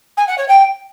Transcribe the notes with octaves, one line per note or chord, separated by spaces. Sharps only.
G#5
F#5
C#5
G5